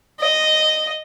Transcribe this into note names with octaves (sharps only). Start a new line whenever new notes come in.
D#5